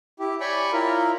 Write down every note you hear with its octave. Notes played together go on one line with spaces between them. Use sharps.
E4 G4
C#5 D5 G5 G#5 B5 C#6
E4 F4 A#4